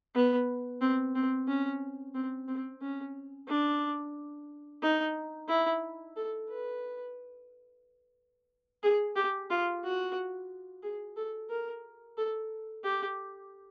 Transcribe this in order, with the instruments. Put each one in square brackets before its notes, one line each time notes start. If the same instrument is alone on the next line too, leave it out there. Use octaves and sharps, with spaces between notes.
[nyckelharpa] B3
C4
C4
C#4
C4
C4
C#4
D4
D#4
E4
A4
B4
G#4
G4
F4
F#4
G#4
A4
A#4
A4
G4